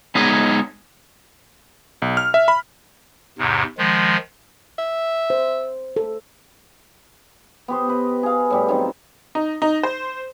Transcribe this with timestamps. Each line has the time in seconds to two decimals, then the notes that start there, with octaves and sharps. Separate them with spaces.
0.15 G#3 B3 D#4 G#4 C#5 D#5
2.02 B1
2.17 F6
2.34 E5
2.48 B5
3.38 E2 G#2 C3
3.78 D#3 F3 G#3
4.79 E5
5.30 C5
5.96 A4
7.68 B3 G4 C5
7.88 G4 B4 D#5
8.23 G#4 F5
8.51 A2 G3 G4
8.68 D#3 F#3 C4
9.35 D#4
9.62 D#4
9.83 C5